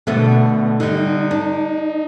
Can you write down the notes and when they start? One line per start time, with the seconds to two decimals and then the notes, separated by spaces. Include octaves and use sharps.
0.07 B2 D3 A3 B3
0.80 D3 G3 D#4
1.31 D4